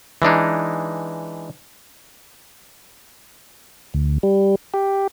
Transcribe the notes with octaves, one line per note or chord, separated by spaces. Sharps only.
E3 G#3 D4 D#4
D2
G3
G4